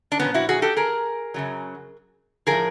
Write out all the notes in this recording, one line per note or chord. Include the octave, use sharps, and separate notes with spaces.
D4
A#2 F3 B3 C#4
E4 F#4
F#4 G#4
G4 A4
G#4 A#4
F#2 C#3 F#3
A2 F3 G#4 A#4